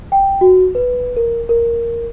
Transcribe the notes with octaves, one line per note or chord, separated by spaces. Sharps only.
G5
F#4
B4
A#4
A#4